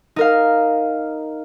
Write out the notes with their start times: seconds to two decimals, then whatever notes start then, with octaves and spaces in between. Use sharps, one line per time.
0.16 D#4 A#4 F5